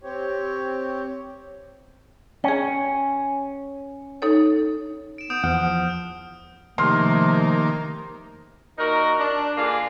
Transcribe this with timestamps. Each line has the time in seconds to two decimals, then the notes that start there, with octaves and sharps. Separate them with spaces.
0.03 C4 G4 C#5
2.44 C#4 G#4 G5
4.22 D#4 A4 C#5
5.18 D7 E7
5.30 B3 D#6 G6 D7
5.44 E2 F3 F#5 F6
6.78 C3 D#3 F3 A3 A#3 C6 F6
8.78 A#2 D#4 F#4 A#4
9.19 D4
9.57 D3 A#3 F4 G#4 D5